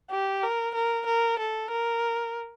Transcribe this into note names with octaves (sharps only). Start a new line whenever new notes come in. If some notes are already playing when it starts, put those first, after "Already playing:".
G4
A#4
A#4
A#4
A4
A#4